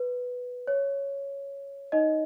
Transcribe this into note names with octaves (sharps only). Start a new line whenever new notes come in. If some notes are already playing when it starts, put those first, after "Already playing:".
Already playing: B4
C#5
D#4 D#5